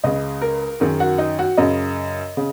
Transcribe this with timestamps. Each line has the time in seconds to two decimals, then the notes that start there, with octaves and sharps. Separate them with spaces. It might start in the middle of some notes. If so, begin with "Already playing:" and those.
0.04 C#2 C#3 D#5
0.42 A#4
0.80 F#2 D#3 G#4
1.00 F#4
1.18 D#4
1.39 F#4
1.57 F#2 C#3 D#5
2.37 C#3